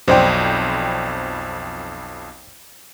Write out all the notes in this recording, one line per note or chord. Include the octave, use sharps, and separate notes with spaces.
B1 F2 C5 D5 G5